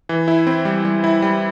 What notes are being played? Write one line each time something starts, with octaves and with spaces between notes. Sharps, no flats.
E3
E4
C4
G3
G3
E4
G3